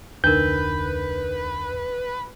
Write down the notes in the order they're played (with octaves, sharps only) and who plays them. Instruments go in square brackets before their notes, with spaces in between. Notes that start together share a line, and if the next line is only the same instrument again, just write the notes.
[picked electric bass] F1 D2 [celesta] D4 D#4 A#4 [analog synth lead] B4 [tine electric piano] G6